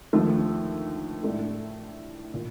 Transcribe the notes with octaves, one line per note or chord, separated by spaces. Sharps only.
D#2 D3 F3 A3
A2 A3 D4
A#2